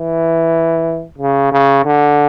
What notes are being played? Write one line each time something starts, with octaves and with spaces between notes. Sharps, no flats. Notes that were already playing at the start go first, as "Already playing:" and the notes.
Already playing: E3
C#3
C#3
D3